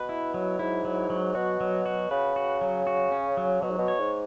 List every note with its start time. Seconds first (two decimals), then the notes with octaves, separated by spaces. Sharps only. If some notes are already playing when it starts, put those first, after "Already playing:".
Already playing: B2 B4
0.09 E4
0.34 F#3
0.59 G#2 E4
0.85 F#3
1.10 F#3
1.35 B2 F#4
1.61 F#3
1.86 F#4
2.11 C#3 B4
2.36 F#4
2.61 F#3
2.87 F#4
3.12 C#4
3.37 F#3
3.62 B2 F#3
3.71 G#2
3.78 B2
3.88 C#5
4.00 G#2